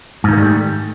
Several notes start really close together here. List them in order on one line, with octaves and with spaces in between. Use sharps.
G#2 D#3 A#3 G3 A3